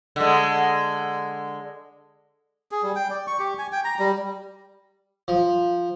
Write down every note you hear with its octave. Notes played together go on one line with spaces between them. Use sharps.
D3 G#3
G#4
G3
G5
D5
C#6
G4
G#5
G5
A#5
G3
F3